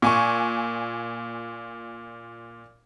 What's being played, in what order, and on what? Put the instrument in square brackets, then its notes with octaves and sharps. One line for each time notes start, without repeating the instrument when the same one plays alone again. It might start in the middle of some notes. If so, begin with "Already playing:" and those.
[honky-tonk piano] A#2 G#5 C#6